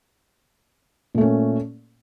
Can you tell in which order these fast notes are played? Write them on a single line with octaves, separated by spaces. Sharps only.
A#2 A3 C#4